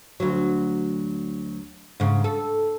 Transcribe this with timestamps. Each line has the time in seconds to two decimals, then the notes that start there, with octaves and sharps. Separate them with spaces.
0.20 D2 F#3
2.00 G#2 C#3
2.24 A4